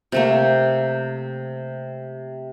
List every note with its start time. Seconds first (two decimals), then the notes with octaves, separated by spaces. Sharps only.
0.12 C3 A3 A#3